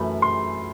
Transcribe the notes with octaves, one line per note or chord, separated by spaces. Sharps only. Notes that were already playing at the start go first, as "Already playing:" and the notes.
Already playing: F#2 E3 A3 B5
C6